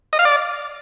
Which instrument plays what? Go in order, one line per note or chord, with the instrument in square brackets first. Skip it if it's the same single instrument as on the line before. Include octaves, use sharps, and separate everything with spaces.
[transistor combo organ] D#5
F5
D5